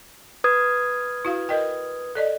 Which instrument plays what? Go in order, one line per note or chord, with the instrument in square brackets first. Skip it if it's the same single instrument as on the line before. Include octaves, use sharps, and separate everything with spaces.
[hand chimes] B4 D#6 G#6
[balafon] E4 F#4 F5
A#4 D#5 G5
A4 D5 D#5